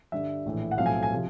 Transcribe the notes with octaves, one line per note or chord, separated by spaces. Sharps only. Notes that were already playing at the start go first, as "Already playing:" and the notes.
G2 D3 G3 E5
A#1 A2 E3
F#5
B1 A2 F3 A3 C4 F5
G#5
G#5
C3 F3